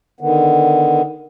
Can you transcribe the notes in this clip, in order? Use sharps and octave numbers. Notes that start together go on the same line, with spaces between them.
D3 D#3 B3